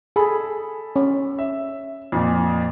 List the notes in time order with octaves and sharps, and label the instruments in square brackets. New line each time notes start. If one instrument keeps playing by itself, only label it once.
[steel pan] G#4 [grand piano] A4 B5
[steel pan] C#4
[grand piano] E5
F2 A#2